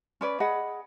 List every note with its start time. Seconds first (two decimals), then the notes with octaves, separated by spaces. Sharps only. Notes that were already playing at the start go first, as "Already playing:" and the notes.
0.21 C#4 B4 D5
0.40 G#4 D#5 F#5 B5